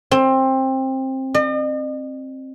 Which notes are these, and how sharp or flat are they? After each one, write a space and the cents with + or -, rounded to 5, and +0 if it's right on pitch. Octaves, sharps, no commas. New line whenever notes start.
C4 +20
D#5 -45